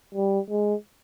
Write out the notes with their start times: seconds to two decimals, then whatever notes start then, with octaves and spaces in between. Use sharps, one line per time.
0.15 G3
0.50 G#3